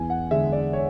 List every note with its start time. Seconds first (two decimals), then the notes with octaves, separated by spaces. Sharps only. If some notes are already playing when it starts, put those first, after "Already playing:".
Already playing: E2 G#5
0.10 F#5
0.31 D3 G#3 E5
0.53 D5
0.73 C#5